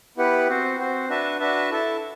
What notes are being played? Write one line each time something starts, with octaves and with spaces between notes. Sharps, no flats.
B3 E4 G4 B4 F#5
C4 F#4 C5
C4 F#4 C5
D4 F#4 B4 E5 A5
D4 F#4 B4 E5 A5
E4 A4 E5 A5